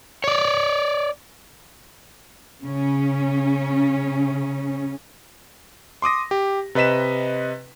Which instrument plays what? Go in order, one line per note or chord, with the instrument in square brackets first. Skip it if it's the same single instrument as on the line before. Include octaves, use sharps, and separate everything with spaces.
[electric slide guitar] C#5 D5
[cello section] C#3 C#4
[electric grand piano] C6 D6 D#6 A#6
G4
C3 B4 D#5 B6 E7